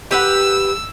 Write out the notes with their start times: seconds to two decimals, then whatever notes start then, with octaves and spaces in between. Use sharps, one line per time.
0.11 G4 B4 F#5 E6